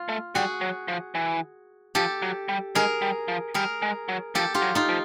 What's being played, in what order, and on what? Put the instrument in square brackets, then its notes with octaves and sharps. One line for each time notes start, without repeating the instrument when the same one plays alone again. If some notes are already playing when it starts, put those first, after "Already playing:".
Already playing: [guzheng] F4
[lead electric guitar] A3
[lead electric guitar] G3 [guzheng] F#4 G#4
[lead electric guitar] F#3
F3
E3
[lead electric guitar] F3 [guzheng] G4 A4
[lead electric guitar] F#3
G3
[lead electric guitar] G#3 [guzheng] G#4 A#4
[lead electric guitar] G3
F3
[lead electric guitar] G3 [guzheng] G#4 A#4
[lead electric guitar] G#3
F#3
[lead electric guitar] F3 [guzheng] G4 A4
[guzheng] F4 G4
[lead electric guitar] F#3
[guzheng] D#4 F4
[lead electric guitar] F3